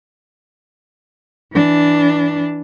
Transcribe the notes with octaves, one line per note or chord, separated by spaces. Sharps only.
E3 D4